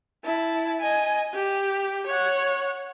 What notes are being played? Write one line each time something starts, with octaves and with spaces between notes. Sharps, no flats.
E4 A5
D#5 G#5
G4
C#5 F#5